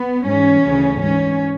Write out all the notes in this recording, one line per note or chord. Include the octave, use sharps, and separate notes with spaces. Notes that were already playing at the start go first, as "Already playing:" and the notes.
Already playing: B3
G#2 E3 C#4
D2 C#3 E3
G#2 E3 C#4